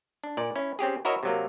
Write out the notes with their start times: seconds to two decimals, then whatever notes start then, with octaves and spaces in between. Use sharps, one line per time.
0.24 D4
0.37 A#2 D5
0.56 C#4 E4
0.79 C4 C#4 G4 G#4
1.05 E4 F#4 A#4 C#5 D#5 E5
1.23 C3 F#3 A#3